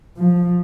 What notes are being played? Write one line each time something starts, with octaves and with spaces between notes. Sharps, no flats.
F3